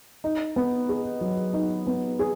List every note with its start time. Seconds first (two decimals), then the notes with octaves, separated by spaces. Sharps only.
0.24 D#4
0.56 B3
0.89 G#4
1.21 F#3
1.54 D#4
1.87 B3
2.19 G#4